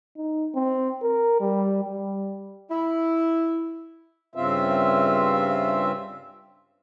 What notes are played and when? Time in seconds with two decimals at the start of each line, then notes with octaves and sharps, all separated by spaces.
0.17 D#4
0.55 C4
1.02 A#4
1.40 G3
1.84 G3
2.70 E4
4.35 G2 C#3 C4 F4 E5